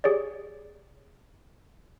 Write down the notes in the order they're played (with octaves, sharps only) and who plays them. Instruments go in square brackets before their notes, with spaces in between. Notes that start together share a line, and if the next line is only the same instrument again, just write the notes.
[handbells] G4 G#4 C#5 D5